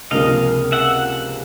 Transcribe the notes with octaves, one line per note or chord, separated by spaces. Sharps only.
C#2 C3 F3 A#3 D4 D#5 F5
E5 F#5